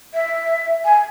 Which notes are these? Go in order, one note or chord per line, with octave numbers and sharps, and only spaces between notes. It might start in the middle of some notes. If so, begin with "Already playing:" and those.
E5
G#5